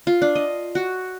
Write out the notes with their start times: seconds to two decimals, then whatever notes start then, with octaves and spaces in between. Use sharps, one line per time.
0.07 F4
0.22 D4
0.35 D#5
0.75 F#4